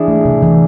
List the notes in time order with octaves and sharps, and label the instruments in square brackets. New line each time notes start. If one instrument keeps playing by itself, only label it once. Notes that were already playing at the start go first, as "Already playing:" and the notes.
Already playing: [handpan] E3 [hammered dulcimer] D4 E4 G#4
[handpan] A3
C3
E3